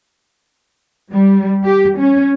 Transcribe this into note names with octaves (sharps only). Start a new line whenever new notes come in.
G3
G4
C#4